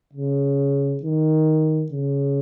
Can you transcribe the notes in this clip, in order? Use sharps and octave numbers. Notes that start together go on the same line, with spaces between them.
C#3
D#3
C#3